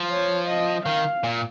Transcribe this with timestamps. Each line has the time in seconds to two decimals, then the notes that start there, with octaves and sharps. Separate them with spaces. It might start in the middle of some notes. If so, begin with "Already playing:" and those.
Already playing: F3
0.11 C#5
0.49 D#5
0.86 D#3 F5
1.24 A#2